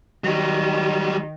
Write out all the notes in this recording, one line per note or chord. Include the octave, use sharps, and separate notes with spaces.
D#3 F#3 G3